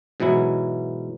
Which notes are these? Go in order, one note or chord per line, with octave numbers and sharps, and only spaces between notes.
G#2 B2 E3 F#3 E4